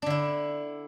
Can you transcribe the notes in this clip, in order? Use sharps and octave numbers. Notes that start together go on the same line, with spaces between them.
D3 D4 E4